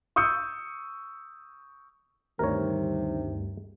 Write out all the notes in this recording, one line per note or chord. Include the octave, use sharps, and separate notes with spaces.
C#6 D#6 E6 G6 C#7
D2 G2 C3 D#3 A#4 C#5